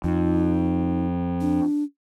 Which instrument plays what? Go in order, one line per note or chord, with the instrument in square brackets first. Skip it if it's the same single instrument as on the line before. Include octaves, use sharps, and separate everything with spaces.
[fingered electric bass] F2 [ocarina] D#4
[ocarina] D4